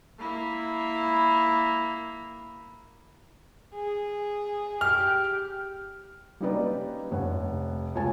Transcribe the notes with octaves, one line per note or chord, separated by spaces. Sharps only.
A#3 E4
G#4
G4 F6
G3 A#3 C#4 D#4 B4 D5
F1 C#5 F#5
C#2 C#5 G#5 A5